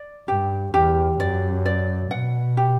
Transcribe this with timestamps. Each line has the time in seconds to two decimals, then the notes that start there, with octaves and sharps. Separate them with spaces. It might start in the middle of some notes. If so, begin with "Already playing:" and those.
Already playing: D5
0.28 G2 G4
0.74 E2 G4
1.19 F#2 D5
1.66 D5
2.11 B2 F#5
2.57 G4